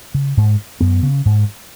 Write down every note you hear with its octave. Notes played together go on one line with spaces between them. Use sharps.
C#3
G#2
F#2 B3
C#3
G#2